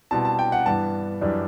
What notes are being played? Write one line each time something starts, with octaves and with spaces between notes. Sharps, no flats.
B2 G3 C4 E4 A5
A5
G5
F#5
G2 E3 B3 D4 A5
F#2 E3 G3 D4